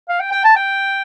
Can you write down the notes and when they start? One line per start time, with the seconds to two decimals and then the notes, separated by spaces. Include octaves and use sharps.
0.09 F5
0.20 G5
0.32 G5
0.44 A5
0.56 G5